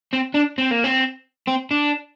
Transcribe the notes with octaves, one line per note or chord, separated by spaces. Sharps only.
C4
D4
C4
A#3
C4
C4
D4